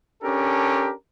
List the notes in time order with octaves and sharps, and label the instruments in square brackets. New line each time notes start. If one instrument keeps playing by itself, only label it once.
[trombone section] C#4 D4 G4 A4 A#4